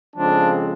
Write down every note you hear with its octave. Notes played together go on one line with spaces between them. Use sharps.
F2 C#3 F3 G#3 C4 D4